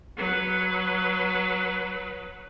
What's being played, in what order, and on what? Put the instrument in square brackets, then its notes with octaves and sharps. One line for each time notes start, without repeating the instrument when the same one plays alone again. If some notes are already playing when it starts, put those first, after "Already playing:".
[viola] F#3 B4